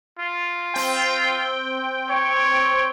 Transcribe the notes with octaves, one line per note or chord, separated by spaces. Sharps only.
F4
C4 G5
C#5